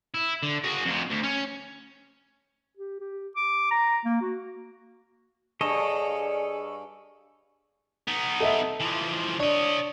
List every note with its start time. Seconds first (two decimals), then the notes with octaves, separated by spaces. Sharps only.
0.14 E4
0.43 D3
0.64 F#4 G#4
0.86 F2 C3
1.11 D2
1.24 C#4
2.77 G4
3.00 G4
3.36 D6
3.71 A#5
4.05 A#3
4.21 F#4
5.61 G2 G#4 A4 C#5 D#5
8.08 B3 D#4
8.40 A4 D#5 E5
8.80 E3 F3
9.40 D4 C#5 D#5